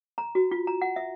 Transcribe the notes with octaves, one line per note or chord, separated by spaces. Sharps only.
A#5
F#4
F4
A#5
F#5
E5